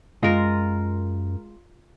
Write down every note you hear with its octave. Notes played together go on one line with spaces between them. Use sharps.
F#2 G#3 F4 A#4 D#5 F5